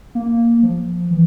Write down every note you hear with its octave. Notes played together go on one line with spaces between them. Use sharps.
A#3
F3
E3